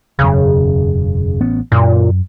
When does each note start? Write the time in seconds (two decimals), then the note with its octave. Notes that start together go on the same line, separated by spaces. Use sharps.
0.19 E1 F#2 C#3
1.41 A1 B3 C#4
1.72 F#2 A#2